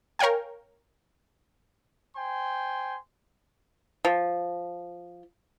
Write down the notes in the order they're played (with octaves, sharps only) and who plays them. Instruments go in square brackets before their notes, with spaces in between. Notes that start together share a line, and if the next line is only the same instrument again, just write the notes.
[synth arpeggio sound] A#4 C#5 F5 G5 G#5
[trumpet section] C5 G5 G#5 C6
[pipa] F3